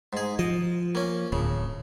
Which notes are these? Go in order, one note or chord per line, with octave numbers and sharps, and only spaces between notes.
G#2 G#4
F3 D#5
A#3 C#4
D1 C#3